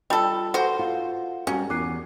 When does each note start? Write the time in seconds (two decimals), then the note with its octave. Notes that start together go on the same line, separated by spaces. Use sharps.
0.10 G3 F4 A4 B5
0.54 F#4 A4 B4 C5 F#5
0.79 F4
1.47 G3 C#4 F#4 A#4
1.70 E2 A#4 G#5 D6 F#6 C7